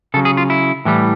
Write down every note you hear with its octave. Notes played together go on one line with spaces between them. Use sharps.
C#3 F#3 A4
G#4
F4
E4
A2 E3 G3